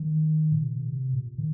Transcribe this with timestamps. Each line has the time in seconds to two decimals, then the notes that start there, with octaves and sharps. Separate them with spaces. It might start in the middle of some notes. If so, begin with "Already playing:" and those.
Already playing: D#3
0.52 A#2
0.64 C3
1.13 A#2
1.38 D#3